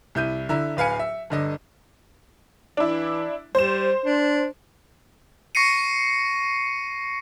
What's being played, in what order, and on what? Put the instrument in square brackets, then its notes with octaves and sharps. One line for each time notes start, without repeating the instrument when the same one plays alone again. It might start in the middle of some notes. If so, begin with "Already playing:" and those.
[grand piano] C2 E4 G6 D#7
D3 E4 A#5
D1 B4 F5 G#5 C#7
E5
G1 D3 D#5
[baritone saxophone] E3 [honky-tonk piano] D4 E4
[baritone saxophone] G3 [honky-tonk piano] C5 E7
[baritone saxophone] D4
[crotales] C#6 A#6 C7 C#7 D#7